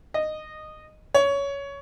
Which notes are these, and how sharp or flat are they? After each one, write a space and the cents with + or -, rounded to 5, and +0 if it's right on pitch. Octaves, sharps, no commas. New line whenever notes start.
D#5 -15
C#5 +15